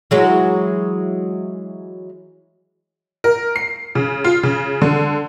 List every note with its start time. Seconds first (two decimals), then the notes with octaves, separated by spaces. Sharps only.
0.11 E3 F#3 G#3
3.24 A#4
3.56 C7
3.95 C#3
4.24 F4
4.43 C#3
4.82 D3